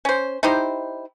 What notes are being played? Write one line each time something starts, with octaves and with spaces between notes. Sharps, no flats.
C#4 C5
D#4 E4 G4 C5